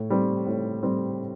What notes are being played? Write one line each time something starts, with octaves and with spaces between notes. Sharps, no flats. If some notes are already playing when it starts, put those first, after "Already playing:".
Already playing: A2
G3 C4
A2
G3 C4